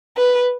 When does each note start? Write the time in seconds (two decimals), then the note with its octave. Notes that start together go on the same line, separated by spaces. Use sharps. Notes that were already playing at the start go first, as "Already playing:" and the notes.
0.17 B4